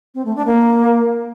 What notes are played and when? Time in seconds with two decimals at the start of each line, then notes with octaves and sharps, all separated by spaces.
0.15 C4
0.25 A3
0.36 D4
0.46 A#3